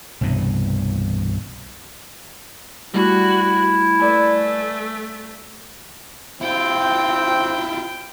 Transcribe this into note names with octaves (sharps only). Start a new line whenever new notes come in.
C2 G2 B2 E3
G3 A3 E4 F#4 F#5
A3 B4 D5 G#5
C4 E4 F4 G5